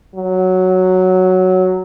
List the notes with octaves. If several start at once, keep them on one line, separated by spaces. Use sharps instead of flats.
F#3